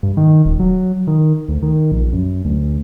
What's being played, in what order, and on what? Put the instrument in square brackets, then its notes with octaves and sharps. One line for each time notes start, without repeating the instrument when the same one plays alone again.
[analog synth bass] G2
D#3
D#1
F#3
D#3
D2
D#3
A#1
F#2
D2